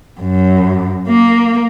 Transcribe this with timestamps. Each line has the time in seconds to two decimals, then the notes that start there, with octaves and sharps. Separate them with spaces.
0.20 F#2
1.09 A#3